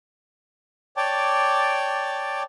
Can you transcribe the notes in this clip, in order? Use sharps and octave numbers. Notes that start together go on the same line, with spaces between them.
C#5 D5 G5 A5 D6